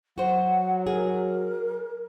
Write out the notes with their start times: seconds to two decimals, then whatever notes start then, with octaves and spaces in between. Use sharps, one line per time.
0.18 F#3 F#4 C5 F#5
0.87 G#4 A#4